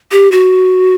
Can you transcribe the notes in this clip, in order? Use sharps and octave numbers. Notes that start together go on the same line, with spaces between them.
G4
F#4